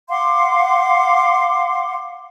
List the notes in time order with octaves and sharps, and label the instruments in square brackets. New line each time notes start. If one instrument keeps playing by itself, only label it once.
[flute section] F5 F#5 C6 D6